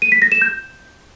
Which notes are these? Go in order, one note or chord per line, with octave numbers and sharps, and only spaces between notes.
D#7
B6
A#6
E7
G6